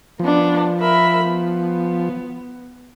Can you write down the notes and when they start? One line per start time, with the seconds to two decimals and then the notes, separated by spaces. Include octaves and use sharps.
0.19 F3 B3 D4
0.80 A#4 E5 B5
1.26 B3